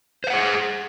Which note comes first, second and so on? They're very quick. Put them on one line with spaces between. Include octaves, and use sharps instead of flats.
C5 F5 F#5 G#4